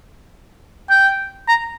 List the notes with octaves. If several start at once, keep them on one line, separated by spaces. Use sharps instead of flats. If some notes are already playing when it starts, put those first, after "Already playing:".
G5
A#5